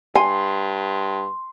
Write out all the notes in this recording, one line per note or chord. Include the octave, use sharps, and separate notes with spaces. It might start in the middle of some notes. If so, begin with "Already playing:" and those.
G2 G#5 C6